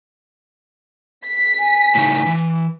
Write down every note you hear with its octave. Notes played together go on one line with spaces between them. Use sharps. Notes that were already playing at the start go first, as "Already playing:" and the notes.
B6
G#5
A2 C#3 D#4
E3